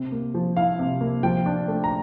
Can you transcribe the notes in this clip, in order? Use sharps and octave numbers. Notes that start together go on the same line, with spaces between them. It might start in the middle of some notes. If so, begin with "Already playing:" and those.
Already playing: C3 C4
A#3
F3
E4 F5
C3
A#3
F3 G5
D4
A3
A#5